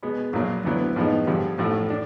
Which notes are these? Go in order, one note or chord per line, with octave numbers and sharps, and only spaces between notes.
B2 G#3 B3
A#1 A#2 F#3 A#3
D2 D3 F#3 B3 E4
A2 F3 G#3 B3 D#4
G2 D3 F3
A1 A2 F3 A3
D4